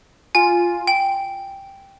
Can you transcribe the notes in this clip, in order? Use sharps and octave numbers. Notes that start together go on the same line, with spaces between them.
F4 G#5
G5